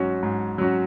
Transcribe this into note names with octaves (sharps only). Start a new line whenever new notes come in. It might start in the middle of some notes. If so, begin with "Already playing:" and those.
Already playing: G#2 F#3 C#4 F#4
G#2
F#3 C#4 F#4